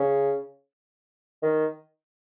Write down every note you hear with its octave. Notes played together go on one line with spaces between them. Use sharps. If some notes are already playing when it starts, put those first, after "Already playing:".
Already playing: C#3
D#3